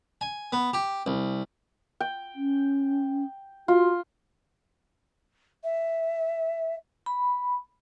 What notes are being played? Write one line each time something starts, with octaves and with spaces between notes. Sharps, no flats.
G#5
B3
G4
C2
G5
C#4
F4 F#4
E5
B5